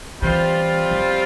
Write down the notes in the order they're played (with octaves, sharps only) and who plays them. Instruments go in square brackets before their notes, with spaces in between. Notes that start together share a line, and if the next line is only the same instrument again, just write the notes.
[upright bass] E3 [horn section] G3 C4 F4
[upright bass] F3